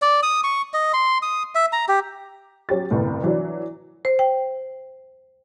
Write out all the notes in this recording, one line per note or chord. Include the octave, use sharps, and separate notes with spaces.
D5
D#6
C#6
D#5
C6
D#6
E5
A#5
G4
F#3 C#4 G4 A6
G1 C2 A2
E3 F#3 D4
C5
G5